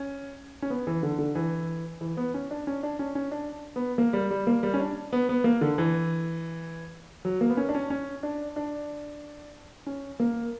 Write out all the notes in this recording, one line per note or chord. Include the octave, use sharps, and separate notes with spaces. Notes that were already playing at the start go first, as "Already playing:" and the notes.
Already playing: C#4
C#4
B3
E3
D3
D3
E3
E3
B3
C#4
D4
C#4
D4
C#4
C#4
D4
B3
A#3
G3
G3
A#3
G3
C#4
D4
B3
B3
A#3
D3
E3
F#3
A#3
B3
C#4
D4
C#4
C#4
D4
D4
C#4
A#3